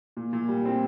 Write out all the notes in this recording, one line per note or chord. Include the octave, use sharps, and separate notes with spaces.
A#2
A#2
G3
C4